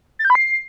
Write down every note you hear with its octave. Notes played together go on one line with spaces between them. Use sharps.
A6
G6
B5
C7